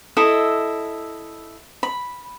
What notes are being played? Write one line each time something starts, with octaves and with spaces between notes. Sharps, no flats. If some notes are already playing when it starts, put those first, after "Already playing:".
E4 A4 D#5 E5
B5